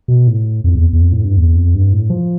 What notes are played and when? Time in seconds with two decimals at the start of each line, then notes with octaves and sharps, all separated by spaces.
0.08 B2
0.28 A2
0.64 F2
0.75 E2
0.93 E2
1.01 F2
1.13 A2
1.25 G2
1.37 E2
1.56 F2
1.74 G2
1.93 A2
2.10 F3